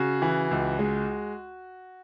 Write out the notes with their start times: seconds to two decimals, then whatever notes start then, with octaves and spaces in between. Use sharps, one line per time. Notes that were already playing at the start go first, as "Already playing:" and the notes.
Already playing: C#3 F#4
0.22 E3
0.51 C#2
0.79 G#3